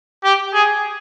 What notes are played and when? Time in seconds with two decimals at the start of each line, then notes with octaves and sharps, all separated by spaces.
0.24 G4
0.54 G#4